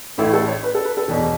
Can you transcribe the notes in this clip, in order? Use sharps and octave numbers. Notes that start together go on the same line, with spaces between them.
A1 A2 A3 E4
A4
C#5
B4
A4
B4
A4
E1 E2 B2